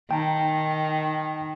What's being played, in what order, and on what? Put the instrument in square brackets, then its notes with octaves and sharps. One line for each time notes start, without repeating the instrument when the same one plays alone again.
[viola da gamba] D#3 [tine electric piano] G5 A5 A#5